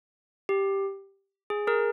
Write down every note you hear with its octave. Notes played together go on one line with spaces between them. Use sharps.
G4
G#4
G#4 A#4